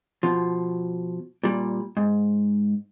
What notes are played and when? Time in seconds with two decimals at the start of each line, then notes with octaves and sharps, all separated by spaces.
0.23 B2 F3
1.43 A#2 G3
1.97 G#2